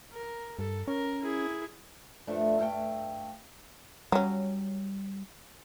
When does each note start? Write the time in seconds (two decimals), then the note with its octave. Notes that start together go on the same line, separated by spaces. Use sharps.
0.13 A#4
0.59 G2 A4
0.88 C#4 A#4
1.22 E4 G#4
2.27 G2 F3 A3 D4
2.59 G2 A3 F5 G5
4.12 F#3 G3 C#4